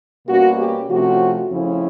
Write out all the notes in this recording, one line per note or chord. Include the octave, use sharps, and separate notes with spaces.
B2 G3 A#3 C#4 F#4
G4
C3 F3 A3 C#4 F#4
F2 C#3 F3 A3 C#4 E4